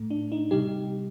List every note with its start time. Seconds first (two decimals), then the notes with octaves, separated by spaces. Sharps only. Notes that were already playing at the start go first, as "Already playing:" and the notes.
Already playing: A2 A3
0.11 D4
0.32 D#4
0.51 C3 G3 D#4 G4